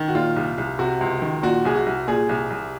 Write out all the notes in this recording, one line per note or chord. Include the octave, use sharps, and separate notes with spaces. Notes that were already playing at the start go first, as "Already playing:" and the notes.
Already playing: D#3
F#4
A#2 F4
C2
C2
C3 F#4
C#2
D#3
A#2 F#4
C2 G#4
F#4
C2
A#2 G#4
C2
C2